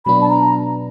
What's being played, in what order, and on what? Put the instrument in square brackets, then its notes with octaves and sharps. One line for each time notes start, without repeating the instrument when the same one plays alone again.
[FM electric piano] B2 F#3 B3 D4 [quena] B5
[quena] A5
A#5